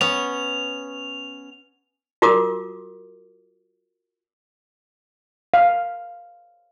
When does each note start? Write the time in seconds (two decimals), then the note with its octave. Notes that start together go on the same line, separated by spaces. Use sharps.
0.01 B3 C#4 F7
2.22 F4 F#4 A#4 D6 D#6
5.54 F5